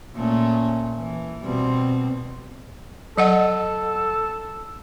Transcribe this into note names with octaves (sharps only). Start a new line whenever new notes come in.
A#2 A3 C#4
E3
B2 G3 C4
F#3 A4 D#5 F#5